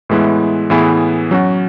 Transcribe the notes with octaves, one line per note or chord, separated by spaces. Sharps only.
A2 E3 G#3 B3 E4
A2 E3 B3 E4 G#4
F#3 C#4 F#4